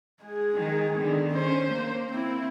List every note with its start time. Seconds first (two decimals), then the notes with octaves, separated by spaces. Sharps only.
0.23 G#3 G#4
0.56 D#3
0.95 D3 D#3 B3
1.33 C#4 C5
1.70 A#3
2.11 C4 E4